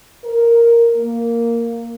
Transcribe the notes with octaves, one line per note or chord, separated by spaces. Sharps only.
A#4
A#3